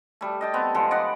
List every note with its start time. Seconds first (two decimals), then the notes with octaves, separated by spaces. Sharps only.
0.21 G3 A3
0.41 D#5 G5 A5
0.53 B3 C4
0.75 F3 G#3 B3 A4
0.91 D5 D#5 F#5 B5